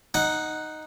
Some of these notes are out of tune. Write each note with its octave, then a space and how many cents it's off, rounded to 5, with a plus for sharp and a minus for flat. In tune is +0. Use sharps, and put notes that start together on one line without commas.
D#4 +0 F#5 +0